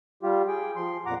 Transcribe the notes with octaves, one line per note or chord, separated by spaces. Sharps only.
G3 F4 G4
G#4 G5
F3 C6
F2 A#2 F#5 A#5 D6